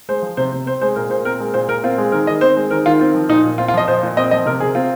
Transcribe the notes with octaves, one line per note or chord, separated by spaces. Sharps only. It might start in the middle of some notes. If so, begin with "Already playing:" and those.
G#3 C5
F3
C3 C5
C3
C4 C5
G#3 C5
A#2 A#4
A#2 C5
C4 A#4
G#3
A#2 C5
A#2 A#4
C4 F4
G#3
D#3 A#4
D#3 D#5
C4 C5
G#3
D#3 A#4
D#3 F4
C4 F4
F3
A#2 D#4
A#2
C4 F4
F4
F3 D#5
A#2 C5
A#2
C4 D#5
F3 D#5
C3 A#4
C3 G#4
C4 F4